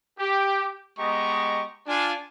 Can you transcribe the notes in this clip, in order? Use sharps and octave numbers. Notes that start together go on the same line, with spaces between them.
G4
G#3 B3 G4 D#5 A#5 C#6
D4 F4 G#5